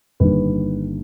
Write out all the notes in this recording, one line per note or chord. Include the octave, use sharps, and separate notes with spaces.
G1 G2 D#3 G3 A#3 B4